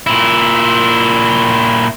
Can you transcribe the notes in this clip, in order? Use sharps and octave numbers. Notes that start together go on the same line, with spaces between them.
A#2 E4